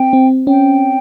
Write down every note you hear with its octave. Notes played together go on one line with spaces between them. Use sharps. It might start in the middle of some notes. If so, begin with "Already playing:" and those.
Already playing: C4 G5
C4
C#4 G5